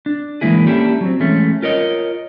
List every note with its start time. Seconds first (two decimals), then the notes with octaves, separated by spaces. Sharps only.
0.06 D4
0.41 E3 F3 G#3 A#3 E4 G#4
0.67 A#3 C#4 D4 E4 G4 A4
1.01 F#3 C4
1.20 E3 G#3 A3 C#4
1.62 F4 A#4 C#5 D#5